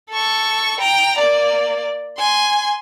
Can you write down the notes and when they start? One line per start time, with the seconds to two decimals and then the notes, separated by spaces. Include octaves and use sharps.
0.10 A4 C#6
0.80 G5 A#5
1.19 A#3 D5
2.18 G#5 C6